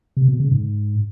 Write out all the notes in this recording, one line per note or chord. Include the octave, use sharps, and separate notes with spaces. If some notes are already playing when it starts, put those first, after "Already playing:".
C3
B2
C#3
G#2